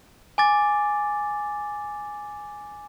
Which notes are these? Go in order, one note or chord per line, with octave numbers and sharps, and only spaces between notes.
G#5 D6 A6